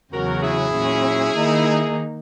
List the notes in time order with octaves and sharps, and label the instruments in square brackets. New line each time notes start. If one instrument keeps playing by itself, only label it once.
[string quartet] E2 C#3 F#3 C#4 [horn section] F#4 A#4
[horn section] E4 G#4
[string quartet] A#2 F#3 C#4
D#3 A#3 D#4